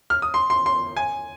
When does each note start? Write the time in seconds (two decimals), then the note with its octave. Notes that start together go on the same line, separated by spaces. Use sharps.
0.10 F6
0.22 D#6
0.34 C6
0.50 C6
0.66 C6
0.96 G#5